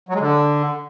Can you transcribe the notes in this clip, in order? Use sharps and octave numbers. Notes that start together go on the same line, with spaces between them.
F#3
G#3
D3